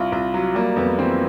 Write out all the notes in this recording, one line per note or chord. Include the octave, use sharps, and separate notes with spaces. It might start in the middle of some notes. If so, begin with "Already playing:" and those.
Already playing: C2 F4
C2 F4
F#3
G3 A#3
F2 B3
E3 C4